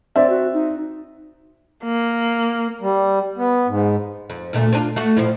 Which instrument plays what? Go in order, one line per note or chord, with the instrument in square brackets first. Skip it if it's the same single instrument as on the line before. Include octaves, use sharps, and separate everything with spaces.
[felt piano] C4 E5 [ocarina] D5
[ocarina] F#4
D#4
[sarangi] A#3
[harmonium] G3
B3
G#2
[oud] F2
D2 A#2 A3
C4 D4 F4
A3 F4 F#4
A2 F3 E4